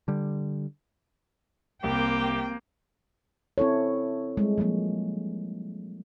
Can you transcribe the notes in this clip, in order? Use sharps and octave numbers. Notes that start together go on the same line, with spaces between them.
D3 G3
C2 A#3 C4 G4 G5
C4 E4 A4 C#5
G3 G#3
F3 F#3 G#3 A#3